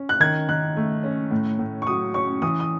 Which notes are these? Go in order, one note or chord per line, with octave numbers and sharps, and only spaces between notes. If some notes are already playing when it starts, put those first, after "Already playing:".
Already playing: C#4
F#6
D#3 G#6
D#3 F#6
A3
C#4
A2
A2
C#6
F#3 D#6
C#4 C#6
E3 D#6
D#6